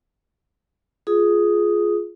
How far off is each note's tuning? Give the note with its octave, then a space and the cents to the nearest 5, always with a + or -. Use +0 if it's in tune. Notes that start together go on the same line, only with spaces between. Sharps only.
F4 +0 G#4 +15 D#6 +0